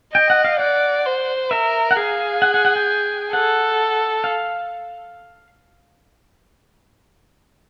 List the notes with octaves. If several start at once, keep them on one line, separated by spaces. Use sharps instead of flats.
D#5 G5
F#5
F5
D5 F#5
C5
A#4 E5
F#5
G#4 F5
F#5
F#5
F#5
G5
A4 F#5
F5